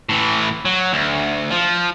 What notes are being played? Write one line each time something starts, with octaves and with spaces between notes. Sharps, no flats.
A2 E3
F#3
D2
F3